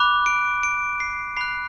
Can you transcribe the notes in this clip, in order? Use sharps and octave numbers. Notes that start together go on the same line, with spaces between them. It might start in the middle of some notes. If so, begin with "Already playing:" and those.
Already playing: B5 D6 F#6
D7
D7
C7
B5 F#6 C7